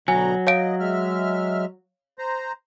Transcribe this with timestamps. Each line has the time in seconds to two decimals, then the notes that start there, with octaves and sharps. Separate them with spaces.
0.08 D2 B2 F#3 G#5 A#5
0.47 C#5 D#5 F5 D7
0.80 G#3 E5 F6
2.19 C5 A#5